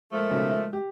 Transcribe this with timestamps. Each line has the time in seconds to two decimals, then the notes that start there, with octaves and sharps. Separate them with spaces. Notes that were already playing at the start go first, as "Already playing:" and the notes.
0.12 A#2 F3 G#3 A3
0.31 B1 C#3
0.50 E5
0.73 G4